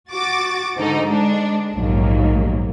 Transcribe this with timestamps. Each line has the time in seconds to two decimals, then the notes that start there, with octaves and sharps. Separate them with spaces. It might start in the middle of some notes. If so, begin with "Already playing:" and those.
0.10 F#4 D6 A6
0.76 G#2 D3 D#4 A4
1.06 G#3 D4
1.75 A#1 D#2 G#2 F#3 A#3